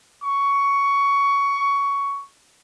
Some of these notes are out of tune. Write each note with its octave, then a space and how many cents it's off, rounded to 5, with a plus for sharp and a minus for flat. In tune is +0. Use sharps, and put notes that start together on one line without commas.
C#6 +15